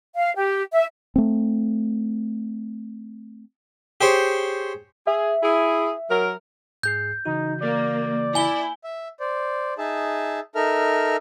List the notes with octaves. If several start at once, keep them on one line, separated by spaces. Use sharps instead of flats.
F5
G4
E5
A3 C4
G4 G#4 C5 C#5
G#4 E5
E4 G#4
F#3 A#4
G#2 G#4 G6 C7
C#3 E3 D#4 F#4
A#3 D5
E4 G#5 G7
E5
C5 D5
D#4 G#4 E5 A5
D#4 A4 A#4 E5 F6